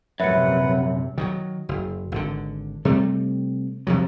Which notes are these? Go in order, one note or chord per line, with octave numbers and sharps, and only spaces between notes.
A#1 F#2 C3 B4 E5 F#5 C#7
D#3 E3 F#3
F#1
G#1 D3
C3 G3 A3 C4
C3 F3 F#3